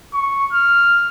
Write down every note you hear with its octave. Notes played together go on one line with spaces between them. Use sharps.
C#6
F6